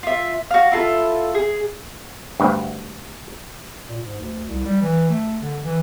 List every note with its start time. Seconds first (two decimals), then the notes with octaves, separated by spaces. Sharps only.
0.03 F4 E5
0.51 F#4 F5
0.72 E4 F4 A4
1.35 G#4
2.40 D2 G2
3.89 A#2
4.03 G#2
4.20 D2
4.48 C2
4.65 G3
4.81 E3
5.10 A3
5.41 D3
5.63 E3